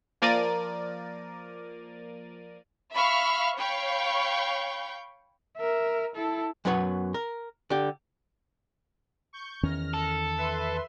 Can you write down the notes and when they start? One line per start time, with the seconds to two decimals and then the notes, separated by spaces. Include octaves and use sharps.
0.22 F3 A#3 A#4 D5 A6 D#7
2.92 E5 F5 B5 C#6 F6
3.58 C#5 F5 G5 B5 C#6 G6
5.57 A#4 E5
6.15 E4 A4
6.65 F#2 F#3 B3 B4 C#5
7.14 A#4
7.70 D3 G4
9.33 C#6 G6
9.63 E2 D#3 C#4 F6 A#6
9.94 A4
10.38 B4 E5 C6